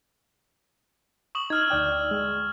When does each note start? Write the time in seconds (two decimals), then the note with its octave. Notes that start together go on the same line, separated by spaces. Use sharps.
1.35 C#6 D#6 F#7
1.50 D#4 E6 F6 G#6
1.70 D2 D5 G5
2.11 G#3